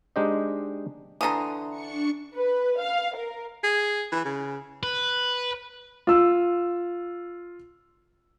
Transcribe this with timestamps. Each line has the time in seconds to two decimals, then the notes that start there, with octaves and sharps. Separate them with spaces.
0.16 G#3 D4 D#4 G4 C5 D#5
1.21 D3 E3 A#5 C6 D#6
1.69 D4 C#6 C#7
2.35 B4
2.79 F5
3.15 A#4
3.64 G#4
4.12 E3
4.25 C#3
4.83 B4
6.07 F4 E6